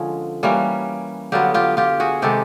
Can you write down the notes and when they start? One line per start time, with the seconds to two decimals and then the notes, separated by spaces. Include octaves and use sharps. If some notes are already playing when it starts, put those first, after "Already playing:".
Already playing: D3 F3 G#3 C#4 G#4
0.43 E3 G3 A#3 C#4
1.32 D3 F#3 B3 F4 G4
1.54 F4 G4
1.77 F4 G4
2.00 F#4 G#4
2.22 C3 D#3 G#3 G4 A4